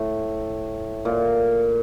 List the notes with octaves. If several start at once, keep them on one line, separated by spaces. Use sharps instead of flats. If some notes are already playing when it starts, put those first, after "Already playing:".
Already playing: A2
A#2